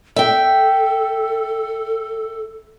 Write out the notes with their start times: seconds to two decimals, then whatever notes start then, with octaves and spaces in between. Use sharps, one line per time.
0.16 A4 E5 G5